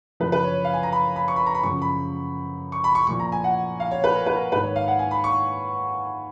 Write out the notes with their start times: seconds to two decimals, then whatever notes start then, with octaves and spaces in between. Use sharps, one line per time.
0.20 F#2 C#3 F3 B4
0.32 B4
0.44 C#5
0.65 F5
0.73 G#5
0.83 A#5
0.92 B5
1.16 B5
1.28 C#6
1.36 B5
1.46 A#5
1.55 B5
1.63 F#2 C#3 F3 C#6
1.82 B5
2.72 C#6
2.84 B5
2.95 C#6
3.07 A#2 F3 C#6
3.20 A#5
3.32 G#5
3.44 F#5
3.80 F5
3.91 C#5
4.04 B4
4.16 A#4
4.26 B4
4.36 A#4
4.52 G#2 B4
4.55 D#3
4.63 C#5
4.76 F5
4.88 F#5
4.99 G#5
5.11 B5
5.24 C#6